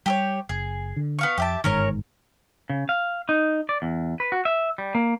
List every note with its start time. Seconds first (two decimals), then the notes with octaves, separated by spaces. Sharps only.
0.06 G3 G4 A4 C#5
0.49 F#1 G#4
0.96 D3
1.19 B3 F5 C#6
1.38 F2 G4 E5 A5
1.64 G1 G#2 D#3 C#4 A#4 C#5
2.70 C#3
2.89 F5
3.29 D#4
3.69 D5
3.82 E2
4.20 B4
4.32 F#4
4.45 E5
4.78 G3
4.95 A#3